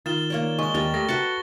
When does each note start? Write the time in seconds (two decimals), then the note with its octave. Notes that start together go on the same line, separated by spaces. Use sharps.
0.06 D#3 F4 A6 E7 G7
0.30 A#3 C#5 D5
0.59 G#3 C#6 G7
0.74 D#2 G3 A#4 A6
0.94 A3 G4 A#6
1.09 F#4 A4 B4 F#6 A6 C#7